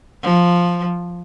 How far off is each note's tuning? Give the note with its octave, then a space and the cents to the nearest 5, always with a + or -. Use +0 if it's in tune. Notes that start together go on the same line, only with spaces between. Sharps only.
F3 +5